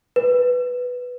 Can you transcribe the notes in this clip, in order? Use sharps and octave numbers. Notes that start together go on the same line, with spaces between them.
B4